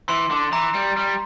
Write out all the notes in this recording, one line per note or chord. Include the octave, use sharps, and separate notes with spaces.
E3 C6
D3
E3 A#5
G3
G3